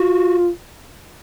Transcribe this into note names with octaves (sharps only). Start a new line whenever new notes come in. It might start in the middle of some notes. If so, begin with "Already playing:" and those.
Already playing: F4 F#4